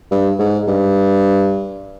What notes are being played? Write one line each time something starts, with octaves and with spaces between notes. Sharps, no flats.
G2
G#2
G2